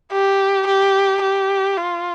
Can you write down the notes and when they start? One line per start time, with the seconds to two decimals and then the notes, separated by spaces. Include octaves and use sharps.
0.12 G4
0.67 G4
1.22 G4
1.77 F4